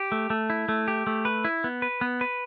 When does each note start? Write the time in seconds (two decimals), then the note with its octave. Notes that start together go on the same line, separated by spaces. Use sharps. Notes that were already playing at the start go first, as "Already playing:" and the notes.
Already playing: G4
0.12 A3
0.30 A3
0.50 E4
0.69 A3
0.88 G4
1.07 A3
1.25 B4
1.45 E4
1.64 B3
1.82 B4
2.01 B3
2.21 B4